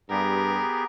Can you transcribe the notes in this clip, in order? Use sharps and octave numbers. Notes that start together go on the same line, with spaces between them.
G2 B3 G4 G#4 A#4